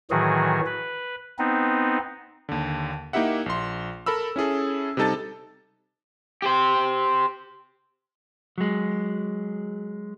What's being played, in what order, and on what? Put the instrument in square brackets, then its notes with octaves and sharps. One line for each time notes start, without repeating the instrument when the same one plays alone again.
[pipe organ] A2 D#3 E3 F#3 F#4 G#4
B4
B3 C4 D#4
[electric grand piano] D#2 D3
A#3 D#4 E4 G4 E5 F#5
A#1 C6
A4 A#4 B5 E6
C#4 E4 G#4 A4
C3 G3 D#4 A4 A5 A6
[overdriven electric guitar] G4 C5
[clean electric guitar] F#3 G#3